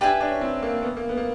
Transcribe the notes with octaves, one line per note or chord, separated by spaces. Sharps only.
D4 G4 B4 E5 G#5
D4
C#4
C4
A#3
B3
A#3
B3
A#3